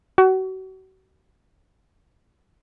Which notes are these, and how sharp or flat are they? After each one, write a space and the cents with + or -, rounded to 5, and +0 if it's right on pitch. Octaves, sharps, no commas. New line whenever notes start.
F#4 +35